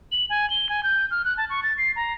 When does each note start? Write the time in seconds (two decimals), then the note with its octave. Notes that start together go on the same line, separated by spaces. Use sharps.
0.12 F#7
0.30 G#5
0.50 G7
0.69 G#5
0.83 G6
1.11 F6
1.25 F#6
1.37 A5
1.50 C#6
1.63 A6
1.78 C7
1.96 A#5